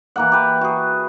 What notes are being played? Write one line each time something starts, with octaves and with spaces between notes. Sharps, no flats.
E3 A#3 F#5
G4 B4
F#4 G#4